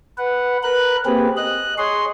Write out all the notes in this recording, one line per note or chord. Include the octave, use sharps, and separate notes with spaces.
B4 F#5
A#4 B4 F#6
A#3 C4 G4 G#4 B4
D#5 F#6
G#4 C#5 D#5 C6